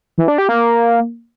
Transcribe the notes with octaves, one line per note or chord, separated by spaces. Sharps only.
E3
D4
G4
A#3